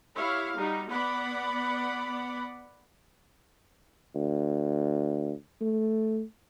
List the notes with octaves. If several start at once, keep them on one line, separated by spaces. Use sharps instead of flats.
E4 G4 C#5 F5
G3 D#4 F#4
B3 D5 F#5 B5
D2
A3